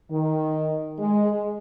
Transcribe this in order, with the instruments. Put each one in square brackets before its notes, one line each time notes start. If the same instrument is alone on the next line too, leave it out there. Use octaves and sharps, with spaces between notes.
[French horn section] D#3
G#3